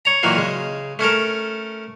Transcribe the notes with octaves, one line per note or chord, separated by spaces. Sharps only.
C#5 A#5
A#2 D#3 E3 F#3 A#3
C#3 G#3
A3 C#4 A4 A#4